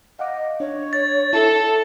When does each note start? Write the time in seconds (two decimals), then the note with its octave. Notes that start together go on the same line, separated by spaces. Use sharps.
0.19 D#5 F5 F#5 D6
0.60 D4 C#5
0.93 A6
1.33 E4 A4 A5